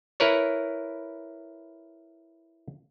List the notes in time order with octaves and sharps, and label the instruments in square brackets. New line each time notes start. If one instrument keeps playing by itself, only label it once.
[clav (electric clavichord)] E4 A#4 B4 C#5